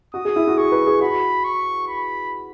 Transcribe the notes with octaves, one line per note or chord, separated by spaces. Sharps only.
F#4 D#6
G#4
E4
F#4
G#4 C#6
B4
G#4
F#4 B5
C#6
B5